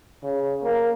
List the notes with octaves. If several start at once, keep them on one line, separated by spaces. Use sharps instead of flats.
C#3
A#3